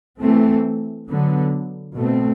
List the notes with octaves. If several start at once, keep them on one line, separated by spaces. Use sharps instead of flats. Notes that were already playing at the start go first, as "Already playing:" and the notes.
E3 A3 C4
D3 F#3 B3
B2 A3 C4